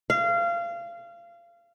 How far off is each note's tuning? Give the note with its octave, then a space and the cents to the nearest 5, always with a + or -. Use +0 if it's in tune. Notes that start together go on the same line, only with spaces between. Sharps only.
F5 -25